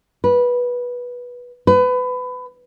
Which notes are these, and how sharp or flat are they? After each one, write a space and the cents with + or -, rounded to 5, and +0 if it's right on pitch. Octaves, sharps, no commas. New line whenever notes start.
B4 -15
B4 +25